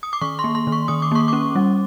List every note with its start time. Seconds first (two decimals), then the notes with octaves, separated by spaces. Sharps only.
0.03 D#6
0.13 D6
0.21 D#3 C#6
0.39 C6
0.44 A#3
0.55 C6
0.67 D#3
0.72 C#6
0.88 D#3 D#6
1.02 D6
1.12 A#3 C#6
1.28 C#4 D6
1.56 G3